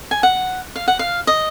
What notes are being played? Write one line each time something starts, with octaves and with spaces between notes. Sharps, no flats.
G#5
F#5
F5
F#5
F5
D#5